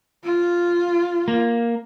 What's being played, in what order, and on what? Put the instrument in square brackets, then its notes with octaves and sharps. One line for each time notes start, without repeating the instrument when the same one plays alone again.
[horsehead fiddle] F4
[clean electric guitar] A#3